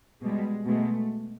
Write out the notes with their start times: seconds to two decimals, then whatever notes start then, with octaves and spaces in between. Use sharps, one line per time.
0.21 B2 G3 G#3
0.65 B2 G#3 A3